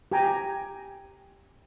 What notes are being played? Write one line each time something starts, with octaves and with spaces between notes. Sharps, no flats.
G4 G5 G#5 A#5